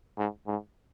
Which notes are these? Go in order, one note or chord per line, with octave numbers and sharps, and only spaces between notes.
G#2
G#2